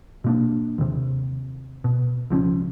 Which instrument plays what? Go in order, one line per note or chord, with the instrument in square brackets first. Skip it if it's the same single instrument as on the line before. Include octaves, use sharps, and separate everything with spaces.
[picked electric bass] B2 A#3 D4
D#2 C3
B2
C#2 F3 C4 C#4